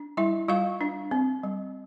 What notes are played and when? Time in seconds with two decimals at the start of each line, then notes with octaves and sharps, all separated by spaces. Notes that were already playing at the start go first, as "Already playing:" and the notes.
Already playing: D4
0.17 G3 E4 E5
0.48 G3 F4 F5
0.81 D4
1.11 C4
1.43 G3